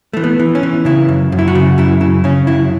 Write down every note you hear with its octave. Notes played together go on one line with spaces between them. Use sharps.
E3 A3
B3
E3
C#4
E3
C#3 E4
F#2
F#2
E4
F#4
C#3
F#2 E4
C#3 E4
C#3 C#4
F#2 E4